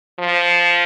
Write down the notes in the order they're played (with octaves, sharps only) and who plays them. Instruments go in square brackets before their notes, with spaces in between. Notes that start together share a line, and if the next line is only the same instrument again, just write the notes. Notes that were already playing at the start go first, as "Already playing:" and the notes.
[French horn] F3